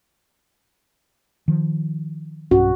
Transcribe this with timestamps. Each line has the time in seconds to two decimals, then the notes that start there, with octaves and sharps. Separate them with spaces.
1.48 D#3 F3
2.51 B1 G2 C#4 F#4